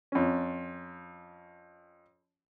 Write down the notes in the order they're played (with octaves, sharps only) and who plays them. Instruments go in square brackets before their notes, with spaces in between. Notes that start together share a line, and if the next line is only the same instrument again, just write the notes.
[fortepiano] F2 C#4